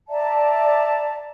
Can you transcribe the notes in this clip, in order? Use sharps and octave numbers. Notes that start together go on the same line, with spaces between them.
D5 E5 A5 A#5